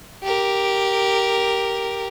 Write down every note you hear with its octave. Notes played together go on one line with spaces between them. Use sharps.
G4 A#4